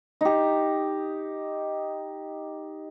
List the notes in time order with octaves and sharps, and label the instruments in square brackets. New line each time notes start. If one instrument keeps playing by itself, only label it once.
[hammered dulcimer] D#4 G4